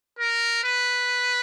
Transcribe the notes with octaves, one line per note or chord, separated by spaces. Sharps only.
A#4
B4